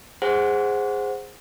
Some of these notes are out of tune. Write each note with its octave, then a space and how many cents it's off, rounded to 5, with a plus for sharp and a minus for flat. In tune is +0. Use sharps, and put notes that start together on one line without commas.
G#4 -10 C5 +0 F#5 +0